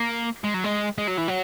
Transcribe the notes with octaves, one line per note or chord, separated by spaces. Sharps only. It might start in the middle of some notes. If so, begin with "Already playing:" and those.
Already playing: A#3
G#3
F#3
G#3
G#3
F#3
E3
F#3